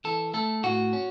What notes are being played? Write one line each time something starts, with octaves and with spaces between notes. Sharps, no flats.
E3 A4
A3 A4
A2 F#4
C#4